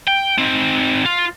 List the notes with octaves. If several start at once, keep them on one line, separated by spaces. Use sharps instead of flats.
G5
D#3 C4
F4